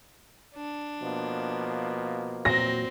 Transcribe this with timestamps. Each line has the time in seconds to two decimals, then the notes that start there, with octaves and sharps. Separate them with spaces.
0.54 D4
1.02 B2 F3 A#3
2.45 E2 A#2 F#3 C4 A#6